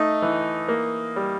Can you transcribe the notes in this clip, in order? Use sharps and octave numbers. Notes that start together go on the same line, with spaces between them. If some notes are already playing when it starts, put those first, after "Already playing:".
Already playing: A3 D#4
E3
A#3
G3